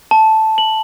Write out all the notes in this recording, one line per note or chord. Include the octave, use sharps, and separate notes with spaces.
A5
F#7